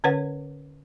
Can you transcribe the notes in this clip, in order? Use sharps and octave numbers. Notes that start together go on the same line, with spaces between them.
D3 C#4 B4 C#5 F#5